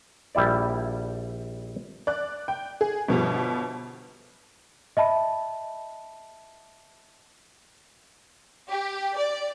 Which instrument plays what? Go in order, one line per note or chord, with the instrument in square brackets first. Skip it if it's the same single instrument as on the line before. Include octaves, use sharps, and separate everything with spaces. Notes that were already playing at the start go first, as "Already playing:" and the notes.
[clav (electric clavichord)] A#1 G3 E4 D5
[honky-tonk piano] D5 F#6
G5
G#4
G1 B2 F3 G3
[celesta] D#5 E5 A5 B5
[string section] G4
D5